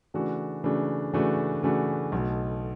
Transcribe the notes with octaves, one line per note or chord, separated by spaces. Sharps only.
C#3 E3 A3 D4 F#4
C#3 E3 A3 D4 F#4
C#3 E3 A3 D4 F#4
C#3 E3 A3 D4 F#4
B1 B2 A3